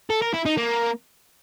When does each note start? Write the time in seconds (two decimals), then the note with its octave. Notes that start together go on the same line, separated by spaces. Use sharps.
0.10 A4
0.22 A#4
0.34 E4
0.46 D#4
0.57 A#3